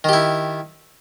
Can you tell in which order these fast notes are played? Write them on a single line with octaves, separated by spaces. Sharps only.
D#3 G4 E4